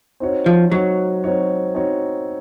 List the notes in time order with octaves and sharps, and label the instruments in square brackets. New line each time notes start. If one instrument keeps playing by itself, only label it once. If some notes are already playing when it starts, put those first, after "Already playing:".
[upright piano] C4 D#4 F#4 C#5
[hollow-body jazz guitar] F3
[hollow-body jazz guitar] F#3 [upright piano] C4 D#4 F#4 C#5
[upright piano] C4 D#4 F#4 C#5
C4 D#4 F#4 C#5